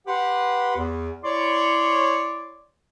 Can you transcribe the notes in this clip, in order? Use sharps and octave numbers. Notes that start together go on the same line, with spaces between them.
G4 B4 F#5 C6
E2
E4 C#5 D5 C6